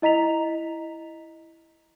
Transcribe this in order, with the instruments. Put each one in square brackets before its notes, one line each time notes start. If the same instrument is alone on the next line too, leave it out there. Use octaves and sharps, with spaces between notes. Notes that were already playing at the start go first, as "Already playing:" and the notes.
[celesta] E4 D#5 A#5 B6 F7